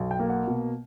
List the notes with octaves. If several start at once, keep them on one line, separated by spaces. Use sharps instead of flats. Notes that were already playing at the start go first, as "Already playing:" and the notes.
Already playing: B1
G5
A#3
F#5
B2